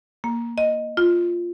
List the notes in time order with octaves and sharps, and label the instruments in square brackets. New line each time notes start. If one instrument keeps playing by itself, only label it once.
[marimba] A#3
D#5
F4